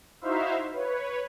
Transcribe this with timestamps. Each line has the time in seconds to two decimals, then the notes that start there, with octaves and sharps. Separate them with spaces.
0.21 D#4 E4 F#4 C5 E5 F5
0.73 B4 C#5